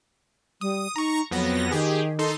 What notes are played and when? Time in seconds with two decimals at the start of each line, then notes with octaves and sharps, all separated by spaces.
0.61 G3 D#6
0.96 D#4 A#5 C#6
1.31 F2 F#3 B3 A#6
1.71 D#3 G4 G#4
2.19 D#4 A4 C6